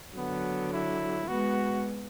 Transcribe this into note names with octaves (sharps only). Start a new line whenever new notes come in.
D3 F#3 B3
E4
G#3 B3 F#4